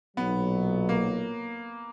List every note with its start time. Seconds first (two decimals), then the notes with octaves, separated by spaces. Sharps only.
0.17 B1 A#2 F#3 B3
0.89 A#3